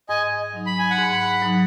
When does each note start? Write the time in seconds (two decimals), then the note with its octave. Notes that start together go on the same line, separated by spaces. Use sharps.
0.09 G#2 D#5 G#5
0.53 F#3 D#4
0.66 B5
0.79 G#5
0.91 F#5 B5
0.97 G#2
1.42 F#3 D#4